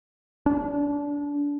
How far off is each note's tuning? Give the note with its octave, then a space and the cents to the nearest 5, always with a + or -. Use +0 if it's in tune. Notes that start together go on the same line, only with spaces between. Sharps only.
D4 -25